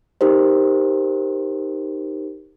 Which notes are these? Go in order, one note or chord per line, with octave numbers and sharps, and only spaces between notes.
D#4 G4 A#4 C5